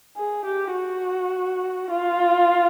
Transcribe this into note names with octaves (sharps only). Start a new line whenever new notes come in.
G#4
G4
F#4
F4